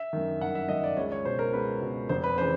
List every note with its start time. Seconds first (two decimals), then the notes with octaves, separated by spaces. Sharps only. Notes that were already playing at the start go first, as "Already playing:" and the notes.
Already playing: E5
0.13 F#2 D#3
0.41 G1 F#5
0.55 E5
0.69 F#2 D#3 D#5
0.84 D5
0.97 C#2 C#5
1.12 C#5
1.25 B2 C5
1.39 A#4
1.53 C#2 B4
1.82 B2
2.09 F1 C5
2.24 B4
2.38 C#3 E3 C5